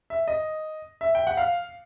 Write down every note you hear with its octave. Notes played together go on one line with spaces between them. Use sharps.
E5
D#5
E5
G5
F#5
F5